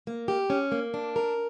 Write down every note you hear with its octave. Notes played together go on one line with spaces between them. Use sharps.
A#3
G4
C#4
A#3
D4
A#4